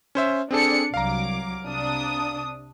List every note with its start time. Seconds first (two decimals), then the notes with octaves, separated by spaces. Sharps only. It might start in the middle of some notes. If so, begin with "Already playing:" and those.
0.15 C#4 C5 E5
0.51 C4 D4 G#4 A4 D5 C#7
0.94 C2 F#3 F5 A#5 D6
1.65 C3 D4 D#6